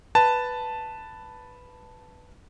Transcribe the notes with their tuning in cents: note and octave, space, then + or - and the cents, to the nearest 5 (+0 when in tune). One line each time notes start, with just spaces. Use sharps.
B4 +0 A5 +0